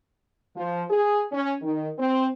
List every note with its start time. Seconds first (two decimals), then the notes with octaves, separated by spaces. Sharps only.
0.56 F3
0.90 G#4
1.32 C#4
1.61 D#3
1.98 C4